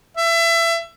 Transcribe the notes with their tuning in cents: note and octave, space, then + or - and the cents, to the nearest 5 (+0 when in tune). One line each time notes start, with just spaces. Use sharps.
E5 +25